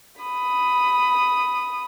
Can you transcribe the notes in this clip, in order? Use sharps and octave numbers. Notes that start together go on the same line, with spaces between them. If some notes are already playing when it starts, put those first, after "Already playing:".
B5 D#6